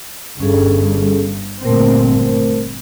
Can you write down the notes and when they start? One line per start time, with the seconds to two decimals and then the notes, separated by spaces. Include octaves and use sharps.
0.40 G1 G2 C#4 G#4 A4
1.63 G1 A#2 A3 C4 A#4 C5